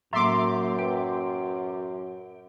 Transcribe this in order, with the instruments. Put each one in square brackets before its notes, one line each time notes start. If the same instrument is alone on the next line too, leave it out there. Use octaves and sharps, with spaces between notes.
[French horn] F#2 [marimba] A2 F#3 [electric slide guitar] A#3 A#5 [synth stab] E5 C6 D6
[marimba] B4 [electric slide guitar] G5